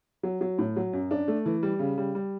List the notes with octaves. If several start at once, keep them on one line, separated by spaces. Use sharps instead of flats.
F#3
F#3
A2
F#3
F#2
D4
A3
E3
G3
C#3
G3
G3